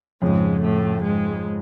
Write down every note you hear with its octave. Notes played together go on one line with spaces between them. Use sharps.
F2 G#2 C#3 F3 G#3
A2 A3
G#2 G#3